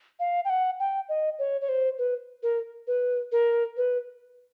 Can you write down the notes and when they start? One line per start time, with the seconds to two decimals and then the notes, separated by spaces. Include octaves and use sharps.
0.20 F5
0.45 G5
0.50 F#5
0.80 G5
1.09 D#5
1.39 C#5
1.61 C#5
1.69 C5
1.99 B4
2.43 A#4
2.87 B4
3.32 A#4
3.77 B4